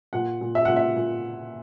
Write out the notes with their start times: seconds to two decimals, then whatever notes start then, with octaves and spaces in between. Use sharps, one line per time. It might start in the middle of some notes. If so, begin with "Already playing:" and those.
0.13 A#2 F#5
0.41 A#2
0.55 E5
0.65 A#2 F#5
0.76 E5
0.96 A#2